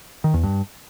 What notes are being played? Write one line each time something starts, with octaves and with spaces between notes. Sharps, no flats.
D#3
E2
G2